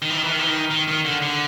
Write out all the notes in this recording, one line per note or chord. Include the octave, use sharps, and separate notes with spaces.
D#3
E3
D#3
E3
D#3
E3
D#3
D#3
D#3
D3
D3